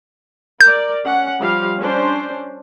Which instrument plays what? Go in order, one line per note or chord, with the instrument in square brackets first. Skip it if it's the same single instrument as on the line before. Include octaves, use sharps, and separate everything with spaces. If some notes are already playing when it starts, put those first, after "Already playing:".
[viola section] A#4 D5 [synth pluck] G6
[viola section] C#4 F#5
F3 G3 F5
C#4 D4 C5